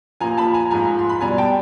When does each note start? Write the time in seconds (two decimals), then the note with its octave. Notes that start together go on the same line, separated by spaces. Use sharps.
0.20 A#2 F3 G#5 A#5
0.38 A5 B5
0.54 G#5 A#5
0.71 G#2 F3 G#5 A#5
0.99 C6
1.09 B5
1.21 B2 G3 G#5 A#5
1.38 G5 A5